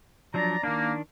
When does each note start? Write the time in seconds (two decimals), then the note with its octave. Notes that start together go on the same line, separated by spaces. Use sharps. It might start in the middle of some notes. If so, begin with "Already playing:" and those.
0.34 F3 F#3 D4 D5 A#5
0.63 D#3 A#3 D4